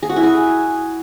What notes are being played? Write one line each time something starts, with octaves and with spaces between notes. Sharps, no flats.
G#4
F#4
E4
G#4